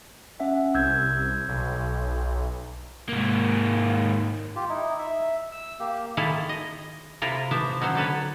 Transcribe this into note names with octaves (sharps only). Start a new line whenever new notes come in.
C#4 E5 F#5
C2 E6 G6 G#6
B1
G#2 A#3
F4 G4
D#4 E4
E5
E6
A#3 G4
D#3 E4 F4 G#4 A4 F5
D#5
C3 E4 F4 A#4
E3 F3 G4 C5 E5
D#3 F#3 C#4 C5
D3 A4 B4 C#5